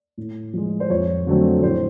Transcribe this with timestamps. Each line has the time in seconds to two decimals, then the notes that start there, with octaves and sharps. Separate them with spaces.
0.18 A2
0.54 F3 G#3
0.80 C5
0.90 F2 C#5
1.27 D3 F#3 A3 C4
1.63 A2 C5